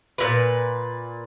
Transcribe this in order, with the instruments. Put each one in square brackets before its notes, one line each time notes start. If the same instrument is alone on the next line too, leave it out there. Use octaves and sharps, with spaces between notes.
[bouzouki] A#2 B4